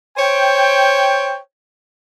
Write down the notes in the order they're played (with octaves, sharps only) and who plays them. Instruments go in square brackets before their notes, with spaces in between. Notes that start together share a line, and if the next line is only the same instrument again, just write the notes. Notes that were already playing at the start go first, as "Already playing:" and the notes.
[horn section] C5 C#5 G5